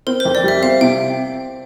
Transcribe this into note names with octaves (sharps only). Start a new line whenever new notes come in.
C4 A#4
C5
F2
D5
G3 E5
C4 F5
C3 G5